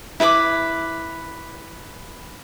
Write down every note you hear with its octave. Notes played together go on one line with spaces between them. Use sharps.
E4 B4 B5 D6